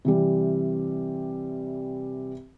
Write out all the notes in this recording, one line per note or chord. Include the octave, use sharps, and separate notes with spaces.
C3 E3 G3